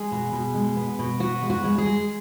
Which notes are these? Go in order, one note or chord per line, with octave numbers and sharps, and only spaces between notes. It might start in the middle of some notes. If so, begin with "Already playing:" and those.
Already playing: G#3 G#4
B2
B2
G#3
B3
B2
B3 F#4
G#3
F#4
G#3
G#4
G#3